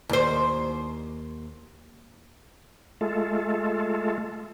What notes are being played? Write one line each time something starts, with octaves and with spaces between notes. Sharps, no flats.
D#2 C5
G#3 A3 F4 A4